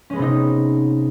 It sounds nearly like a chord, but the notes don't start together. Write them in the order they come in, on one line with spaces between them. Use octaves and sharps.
C#4 G#3 B3 C3 D#4